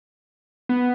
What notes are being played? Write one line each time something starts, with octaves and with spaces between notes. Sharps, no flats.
B3